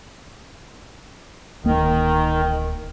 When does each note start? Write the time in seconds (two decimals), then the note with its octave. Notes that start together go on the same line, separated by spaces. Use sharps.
1.64 D1 D#3 A#3